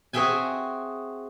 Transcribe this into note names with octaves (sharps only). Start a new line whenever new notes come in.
C4 F#4 G#4 E5 G5 G#5